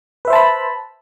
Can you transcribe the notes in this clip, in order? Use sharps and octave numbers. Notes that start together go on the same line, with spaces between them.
B4 C5 E5 A5 B5